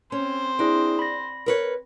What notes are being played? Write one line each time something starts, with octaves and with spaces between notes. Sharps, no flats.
C4 C#4 C5
D4 E4 G#4 D5
B5 A#6
A#4 B4 C#5